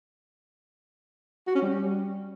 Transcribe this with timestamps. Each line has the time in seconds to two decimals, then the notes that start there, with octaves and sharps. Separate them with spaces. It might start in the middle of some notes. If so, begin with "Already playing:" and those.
1.47 F#4
1.55 C#4
1.62 G3